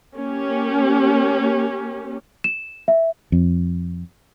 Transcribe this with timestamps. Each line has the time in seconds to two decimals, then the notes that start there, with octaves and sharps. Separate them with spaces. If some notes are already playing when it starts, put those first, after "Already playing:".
0.16 A#3 C#4 G4
2.44 E7
2.88 E5
3.32 F2